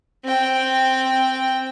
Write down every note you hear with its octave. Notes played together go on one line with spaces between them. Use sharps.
C4 G5